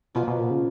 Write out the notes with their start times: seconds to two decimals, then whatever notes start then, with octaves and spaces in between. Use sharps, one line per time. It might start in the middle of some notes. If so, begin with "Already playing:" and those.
0.15 B2 F3 A#3 F4 B4
0.27 B2
0.40 A#2
0.51 C#3